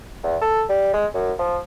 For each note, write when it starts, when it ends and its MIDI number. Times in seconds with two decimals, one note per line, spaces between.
0.23 0.37 40
0.42 0.63 69
0.69 0.93 55
0.94 1.06 56
1.14 1.33 42
1.39 1.59 53